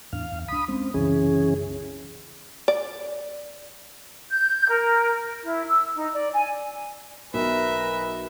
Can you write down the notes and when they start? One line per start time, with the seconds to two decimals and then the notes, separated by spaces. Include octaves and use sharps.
0.13 E2 A2 D4 F5
0.32 E2
0.48 C2 D4 B5 D#6
0.68 G#3 C4 C#4
0.94 C2 F#2 C#3 E3 C#4 G#4
2.68 D5
4.31 G6
4.69 A#4
5.44 E4
5.67 E6
5.96 D#4
6.12 D5
6.32 G#5
7.34 B1 A#4 B4 E5